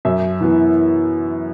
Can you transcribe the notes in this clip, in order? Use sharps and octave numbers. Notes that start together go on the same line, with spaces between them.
F#2 E5
E3 B3 E4